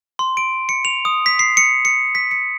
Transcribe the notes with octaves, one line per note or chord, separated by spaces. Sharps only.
C6
D7
C#7
F7
D#6
B6
C7
C#7
C#7
B6
C#7